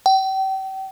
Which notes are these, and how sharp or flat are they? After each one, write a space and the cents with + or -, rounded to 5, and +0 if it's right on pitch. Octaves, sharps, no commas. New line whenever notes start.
G5 -35